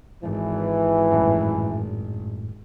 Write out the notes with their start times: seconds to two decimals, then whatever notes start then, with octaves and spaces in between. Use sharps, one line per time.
0.23 G#1 E3
1.12 F#2 A2